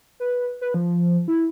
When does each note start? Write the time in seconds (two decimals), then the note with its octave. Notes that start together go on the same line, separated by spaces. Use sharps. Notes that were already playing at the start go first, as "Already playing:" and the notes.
0.20 B4
0.61 B4
0.74 F3
1.28 E4